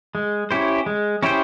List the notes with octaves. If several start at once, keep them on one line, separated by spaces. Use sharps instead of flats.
G#3
C#4 E4 G4 C5
G#3
C#4 E4 G4 C5